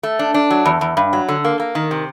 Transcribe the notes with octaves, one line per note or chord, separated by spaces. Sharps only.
A3
D4
D4
F#3
E2
E2
G2
F#3
D3
A#3
A#3
D#3
C3